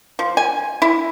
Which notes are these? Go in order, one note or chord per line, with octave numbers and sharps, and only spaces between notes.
F3
G#5
E4